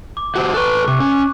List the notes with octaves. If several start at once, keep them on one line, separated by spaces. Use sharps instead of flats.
D6
F#4 G4 C5
A4 B4 C#6 F#6
C3 D6
C#4